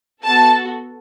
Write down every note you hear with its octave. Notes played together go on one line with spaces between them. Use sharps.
B3 F#4 A4 A5